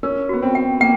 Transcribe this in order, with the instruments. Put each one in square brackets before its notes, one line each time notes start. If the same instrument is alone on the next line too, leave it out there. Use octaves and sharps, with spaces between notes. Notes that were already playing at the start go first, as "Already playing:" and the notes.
[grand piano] C#4 [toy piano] A#4
[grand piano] B3 [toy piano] F#4
[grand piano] C4
[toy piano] G5
[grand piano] A#3 [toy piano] G5